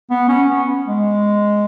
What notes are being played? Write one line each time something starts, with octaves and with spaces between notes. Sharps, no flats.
B3
C#4
B3
G#3